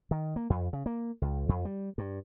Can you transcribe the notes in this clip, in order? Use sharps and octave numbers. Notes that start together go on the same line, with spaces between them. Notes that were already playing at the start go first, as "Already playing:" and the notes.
D#3
A#3
F2
C#3
A#3
C#2
F2
G3
G2